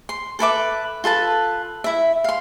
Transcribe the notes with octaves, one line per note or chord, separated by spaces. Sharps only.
C6
A4 B4 E5 D6
F4 A4 B4 A5
E4 E5
F5 C6